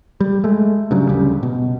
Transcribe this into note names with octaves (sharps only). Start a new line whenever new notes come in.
G3
G#3 A3
G2 C#3 F#3
D1 D2 C#3 G3
B2